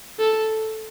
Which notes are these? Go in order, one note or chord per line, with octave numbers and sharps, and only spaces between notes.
A4